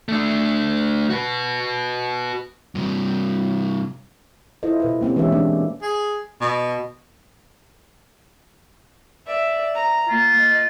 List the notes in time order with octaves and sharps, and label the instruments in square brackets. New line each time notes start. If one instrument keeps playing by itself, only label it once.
[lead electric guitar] A3 D4
F#4 B4
[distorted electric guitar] G2 C3
[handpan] E4 F4 A4 C5 D#5
B2 B4 D#5
A#3 C4 C#4 G4
E3 G#3 D4 G4 C#5 E5
A#3 B3 C#4 D4
[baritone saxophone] G#4
B2
[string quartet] D5 E5
A#5
[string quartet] A#3 [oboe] F4
[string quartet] D#5